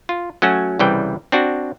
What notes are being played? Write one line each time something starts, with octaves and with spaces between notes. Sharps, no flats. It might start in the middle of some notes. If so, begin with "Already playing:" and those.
F4
F#3 A3 C#4 F#4
C2 C#3 E3 G3 G5
C4 D4 F#4